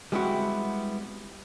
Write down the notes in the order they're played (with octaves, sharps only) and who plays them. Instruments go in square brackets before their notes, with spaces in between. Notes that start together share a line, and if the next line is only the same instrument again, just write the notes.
[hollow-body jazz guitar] G3 G#3 B3 C4 E4 F#4